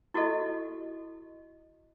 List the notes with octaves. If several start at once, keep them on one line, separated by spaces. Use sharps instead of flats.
E4 F#4 G4 A4 D#5